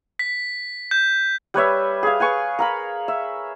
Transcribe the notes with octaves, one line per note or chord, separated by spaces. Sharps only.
B6
G6
G3 B4 C#5 E5
G#4 F5
B4 G#5 C#6
A#4 F5 B5
E5